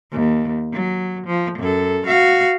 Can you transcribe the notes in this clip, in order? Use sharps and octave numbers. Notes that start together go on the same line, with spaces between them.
D#2
F#3
F3
F#2 A4
F#4 F5